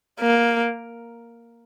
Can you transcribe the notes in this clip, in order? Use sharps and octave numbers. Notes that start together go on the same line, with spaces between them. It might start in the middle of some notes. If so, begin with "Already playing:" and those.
A#3